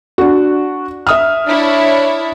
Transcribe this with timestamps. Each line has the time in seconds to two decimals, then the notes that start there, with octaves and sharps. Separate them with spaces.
0.18 D4 F#4
1.07 E5 D#6 F6
1.46 D4 E4 C#5